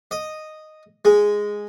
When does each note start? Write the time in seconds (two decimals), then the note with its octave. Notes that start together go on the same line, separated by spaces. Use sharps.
0.11 D#5
1.05 G#3